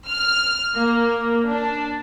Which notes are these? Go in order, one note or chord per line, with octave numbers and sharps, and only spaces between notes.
F6
A#3
D4